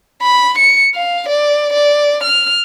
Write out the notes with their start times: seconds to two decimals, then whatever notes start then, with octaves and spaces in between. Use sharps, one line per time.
0.22 B5
0.58 C#7
0.95 F5
1.29 D5
1.73 D5
2.23 F6